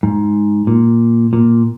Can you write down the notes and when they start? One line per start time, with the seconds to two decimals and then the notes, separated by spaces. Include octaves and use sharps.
0.03 G#2
0.67 A#2
1.33 A#2